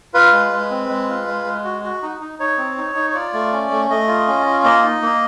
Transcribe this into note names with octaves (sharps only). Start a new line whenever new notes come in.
F4 B4
G#3
G#3
C4
G#3
F4
G#3
G#3
F#4
F#4
D#4
D#4
D#4 C#5
C4
D#4
D#4
C#5
F4 D5
A3
C#4
A3
A3 D#5
F4
C#4
F4
A#3 D#5
D#4
A#3